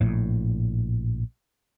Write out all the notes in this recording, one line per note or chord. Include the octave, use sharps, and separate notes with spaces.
A#1 A2